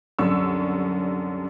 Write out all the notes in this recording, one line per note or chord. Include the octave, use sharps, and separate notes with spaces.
C2 F#2 D3 C#6 E6